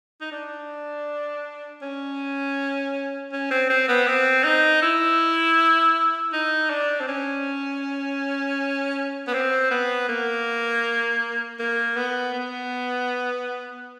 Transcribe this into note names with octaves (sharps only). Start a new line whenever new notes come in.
D#4
D4
C#4
C#4
C4
C4
B3
C4
D#4
E4
D#4
D4
C4
C#4
B3
C4
B3
A#3
A#3
B3
B3